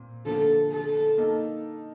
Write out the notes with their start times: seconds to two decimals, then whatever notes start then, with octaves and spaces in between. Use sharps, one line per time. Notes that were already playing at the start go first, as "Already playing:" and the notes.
Already playing: A#2 C4
0.26 D3 F3 A#3 A4
0.72 A4
1.18 A#3 D#4 A4